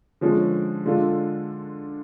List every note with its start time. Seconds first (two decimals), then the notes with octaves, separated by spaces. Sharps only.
0.21 D3 F3 G#3 C#4
0.86 D3 G#3 D4 F4 A4